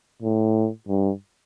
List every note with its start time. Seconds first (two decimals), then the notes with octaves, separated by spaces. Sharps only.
0.22 A2
0.88 G2